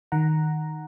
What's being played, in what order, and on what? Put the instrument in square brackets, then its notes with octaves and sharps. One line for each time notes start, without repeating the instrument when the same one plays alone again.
[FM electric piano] D#3 F#5 A#5